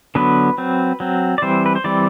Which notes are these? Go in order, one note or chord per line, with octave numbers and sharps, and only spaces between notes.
D3 F#3 B3 B4
F#3 C4
F#3 C4
D5
E3 G3 C4 C5
B4
C5
E3 G3 C4 D5